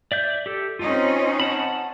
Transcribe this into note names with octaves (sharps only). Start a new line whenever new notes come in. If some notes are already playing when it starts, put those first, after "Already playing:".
D5 E5 G6
G4 A4
C4 C#4 D#4 F4
F#5 A5 B5